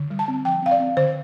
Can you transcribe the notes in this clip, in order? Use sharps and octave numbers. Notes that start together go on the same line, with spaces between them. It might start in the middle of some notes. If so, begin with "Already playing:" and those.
Already playing: D3
G3
A5
C4
F3 G5
C4 F5
D5
C4
D3 C5